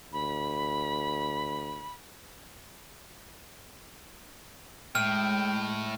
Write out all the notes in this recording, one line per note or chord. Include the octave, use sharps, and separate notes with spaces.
D2 B5
A2 G#3 G5 F6